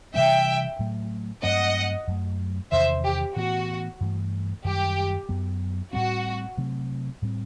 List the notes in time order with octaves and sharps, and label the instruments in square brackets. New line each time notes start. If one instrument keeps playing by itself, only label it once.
[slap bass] C3 E3 G3 C4 [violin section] E5 G5
[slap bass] A2 F#3 A3
[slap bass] G2 F#3 A3 C4 [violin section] D#5 F#5
[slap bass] F#2 F#3 A3
[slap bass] E2 C3 D#3 [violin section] C5 E5
[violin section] G4
[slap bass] A2 E3 B3 [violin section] F#4
[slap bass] G2 E3 A3
[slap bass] F#2 D#3 G3 [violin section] G4
[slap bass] F#2 F#3 B3
[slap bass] A2 G3 C4 [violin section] F#4
[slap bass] C3 F#3 A3 C4
A2 G3 C4